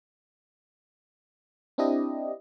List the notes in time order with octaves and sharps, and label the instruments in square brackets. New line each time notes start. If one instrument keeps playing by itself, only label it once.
[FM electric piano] C4 D4 E4 G4 D#5